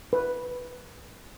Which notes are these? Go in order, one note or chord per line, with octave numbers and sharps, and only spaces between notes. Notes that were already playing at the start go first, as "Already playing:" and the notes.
B4